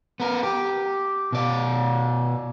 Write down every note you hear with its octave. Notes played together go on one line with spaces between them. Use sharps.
B3 A#4
G4
B2 D5